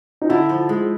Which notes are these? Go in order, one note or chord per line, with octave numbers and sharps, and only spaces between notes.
D#4
D3 E4
F3
G#3